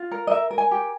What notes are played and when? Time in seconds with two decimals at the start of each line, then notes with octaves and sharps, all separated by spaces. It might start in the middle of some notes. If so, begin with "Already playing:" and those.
Already playing: F4
0.12 A#4
0.27 D#5
0.31 A#4 E5
0.51 A#4
0.58 G#5
0.71 G4